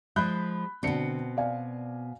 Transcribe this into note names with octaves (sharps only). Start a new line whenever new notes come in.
F3 G#3 B5 F#6 G6
B2 D3 C4 C#7
D5 F5 G#5